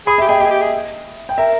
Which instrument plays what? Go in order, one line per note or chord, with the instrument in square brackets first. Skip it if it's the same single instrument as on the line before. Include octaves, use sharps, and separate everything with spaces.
[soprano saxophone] G#4 [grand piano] B5 D#6
[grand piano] E5
[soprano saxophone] G4
[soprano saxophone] G#4 [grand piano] D#5 G5
[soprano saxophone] G4 G#4 [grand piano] D#5
[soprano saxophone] G4
G#4
[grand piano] G5
[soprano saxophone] A#4 [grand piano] E5